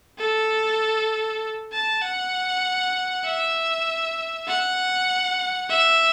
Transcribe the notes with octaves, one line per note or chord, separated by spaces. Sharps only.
A4
A5
F#5
E5
F#5
E5